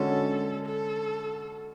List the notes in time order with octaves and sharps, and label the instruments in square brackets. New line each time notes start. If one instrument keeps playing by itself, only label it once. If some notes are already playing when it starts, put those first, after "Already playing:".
Already playing: [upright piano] D3 G#3 C#4 F#4 [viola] A4
[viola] A4